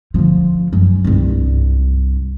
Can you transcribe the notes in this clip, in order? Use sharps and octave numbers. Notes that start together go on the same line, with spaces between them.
D3 F3
F#2
C2 G2